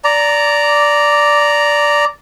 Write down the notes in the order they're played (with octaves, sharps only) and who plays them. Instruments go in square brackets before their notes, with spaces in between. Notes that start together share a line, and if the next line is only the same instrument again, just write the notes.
[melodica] D5 A#5